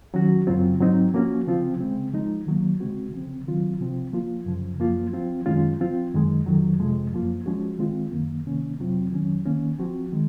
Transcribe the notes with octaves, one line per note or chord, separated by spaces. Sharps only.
D#3 F#3 C#4 F#4
F#2 C#3 F#3 C4 F4
G#2 F#3 C4 D#4
F3 A#3 C#4 F#4
C#3 F3 C4 F4
C#3 G#3 C4
F3 G#3 D#4
D#3 F#3 A#3
C#3 G#3 C4 F#4
C#3 F3 C4
D#3 F#3 C4 F4
C3 F3 C4 F4
F3 A#3 F4
F#2 C#3 F3
F#2 F3 A#3 F4
F3 C4 F4
F#2 D#3 G#3 C#4 F4
F3 C4 F4
F#2 D#3 G#3
F2 D#3 F#3
F2 C3 F3 G#3
F#2 F3 A#3 F4
F3 G#3 C#4 F#4
D#3 G#3 C4 F4
F#2 D#3 A#3
C3 D#3 A#3 C#4
F2 C3 F#3 C4 F4
F2 D#3 F#3 C#4
D#3 A#3 C#4
F3 C4 F#4
D#3 G#3